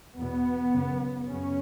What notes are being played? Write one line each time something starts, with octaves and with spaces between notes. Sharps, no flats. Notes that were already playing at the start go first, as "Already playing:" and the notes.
E2 B2 B3
F#2 C#3
F#2 C#3 C#4